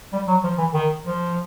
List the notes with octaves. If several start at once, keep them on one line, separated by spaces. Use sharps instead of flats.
G3
F#3
F3
E3
D#3
F3